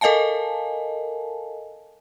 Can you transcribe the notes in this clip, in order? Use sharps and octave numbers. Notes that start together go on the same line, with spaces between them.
A4 A#4 D#5 F5 G#5 A5